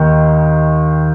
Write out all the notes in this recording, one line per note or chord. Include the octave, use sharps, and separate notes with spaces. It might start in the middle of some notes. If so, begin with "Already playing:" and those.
Already playing: D#2 D#3